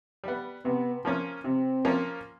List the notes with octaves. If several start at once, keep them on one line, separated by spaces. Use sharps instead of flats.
G3 B3
C3 B3
F3 A#3 C#4
C3 C4
F3 A#3 C#4